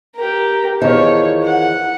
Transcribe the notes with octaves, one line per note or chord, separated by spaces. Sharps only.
G4 A#4
E2 D#3 F3 C#5
F#5